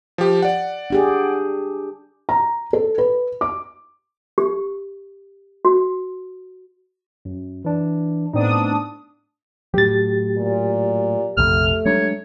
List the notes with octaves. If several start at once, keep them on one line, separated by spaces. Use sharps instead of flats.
F3 G4
D5 F#5
D4 G4 G#4
A#5
A4
B4
D6
G4
F#4
F#2
E3 D4
A2 B3 C4 D4 D#4 D#6
A2 F#3 G4 A6
A#2
A#1 F2 C3 A3 F6
F#3 G#3 D4 C#5